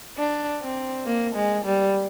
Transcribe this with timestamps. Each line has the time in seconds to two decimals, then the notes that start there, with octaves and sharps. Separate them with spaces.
0.18 D4
0.62 C4
1.06 A#3
1.36 G#3
1.65 G3